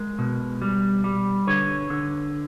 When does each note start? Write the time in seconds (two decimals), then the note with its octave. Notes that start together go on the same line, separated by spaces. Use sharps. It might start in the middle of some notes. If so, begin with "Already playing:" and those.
Already playing: G#3 A#4
0.19 B2
0.62 G3
1.04 G3
1.47 D3 B4 C#5
1.90 D3